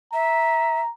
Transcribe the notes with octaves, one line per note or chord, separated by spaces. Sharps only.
E5 A#5